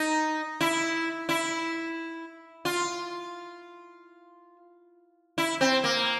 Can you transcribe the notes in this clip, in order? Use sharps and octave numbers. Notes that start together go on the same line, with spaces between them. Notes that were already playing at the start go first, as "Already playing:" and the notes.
Already playing: D#4
E4
E4
F4
E4
C4
A#3